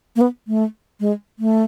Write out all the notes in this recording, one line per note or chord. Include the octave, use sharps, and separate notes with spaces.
A#3
B3
A3
G#3
A3